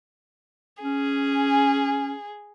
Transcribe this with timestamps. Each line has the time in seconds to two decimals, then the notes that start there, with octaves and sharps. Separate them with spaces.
0.83 C#4 G#4